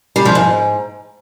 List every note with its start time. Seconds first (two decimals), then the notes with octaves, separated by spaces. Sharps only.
0.16 G3
0.25 F3
0.35 G#2